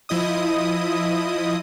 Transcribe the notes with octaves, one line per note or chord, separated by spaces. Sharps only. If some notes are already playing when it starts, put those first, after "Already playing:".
F3 E4 D#5 D#6